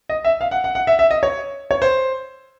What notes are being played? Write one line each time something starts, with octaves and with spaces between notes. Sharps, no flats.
D#5
E5
F5
F#5
F#5
F#5
E5
E5
D#5
C#5
C#5
C5